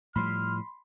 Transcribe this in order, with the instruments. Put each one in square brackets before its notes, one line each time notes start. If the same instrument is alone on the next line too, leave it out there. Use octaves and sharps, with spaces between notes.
[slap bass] A2 F3 G3 [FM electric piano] B5 C6 [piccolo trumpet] F6